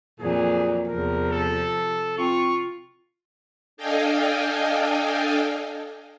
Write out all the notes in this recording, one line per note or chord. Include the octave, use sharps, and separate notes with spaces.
F2 A#2 F#3 A#3 G#4
E2 C3 F3 A#4
A4
C4 F4 C#6
D4 A4 D#5 F5 G5 G#5